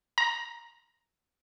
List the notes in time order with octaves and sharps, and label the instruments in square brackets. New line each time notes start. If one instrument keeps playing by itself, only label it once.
[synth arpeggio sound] A#5